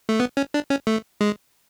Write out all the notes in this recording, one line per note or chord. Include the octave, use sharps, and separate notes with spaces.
A3
B3
C#4
D4
C#4
A3
G#3